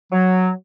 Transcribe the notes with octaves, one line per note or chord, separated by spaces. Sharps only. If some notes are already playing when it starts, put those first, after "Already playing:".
F#3